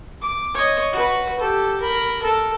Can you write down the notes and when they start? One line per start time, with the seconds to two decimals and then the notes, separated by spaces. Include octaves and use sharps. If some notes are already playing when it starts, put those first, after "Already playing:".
0.22 D6
0.54 C#5 D#5
0.92 F#4 B4
1.39 G4 A4
1.80 A#4 B5
2.22 A4 A#4